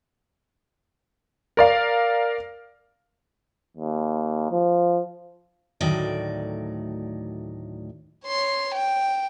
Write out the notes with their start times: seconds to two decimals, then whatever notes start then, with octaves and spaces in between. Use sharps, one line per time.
1.57 A#4 D5 F5
3.77 D#2
4.51 F3
5.81 D2 A2 D#3 F#3 D5
8.26 C#5 C6
8.75 G5